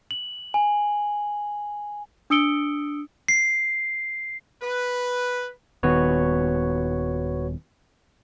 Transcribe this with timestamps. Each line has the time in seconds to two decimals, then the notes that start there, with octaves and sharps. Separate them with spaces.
0.11 F#7
0.54 G#5
2.30 D4 D#6 E6 C#7 D7 G7
3.28 C7
4.62 B4
5.83 D#1 D#3 B3 F#4 B4 C#5